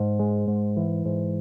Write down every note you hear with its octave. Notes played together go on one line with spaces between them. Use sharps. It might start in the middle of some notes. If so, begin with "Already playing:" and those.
Already playing: G#2
G#3
G#2
E3
G#2